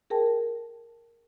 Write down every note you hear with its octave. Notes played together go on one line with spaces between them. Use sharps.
G#4 A#4 G5 A5